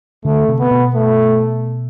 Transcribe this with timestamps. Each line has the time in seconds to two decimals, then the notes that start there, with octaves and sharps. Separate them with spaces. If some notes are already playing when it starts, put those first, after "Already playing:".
0.25 D3 A3
0.48 C3
0.60 B3
0.71 B2
0.95 A3